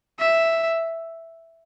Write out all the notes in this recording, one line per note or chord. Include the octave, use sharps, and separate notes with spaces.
E5